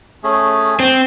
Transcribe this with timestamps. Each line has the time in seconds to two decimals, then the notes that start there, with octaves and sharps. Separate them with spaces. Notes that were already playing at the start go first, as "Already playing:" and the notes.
0.24 A3 C#4 G#4
0.80 C4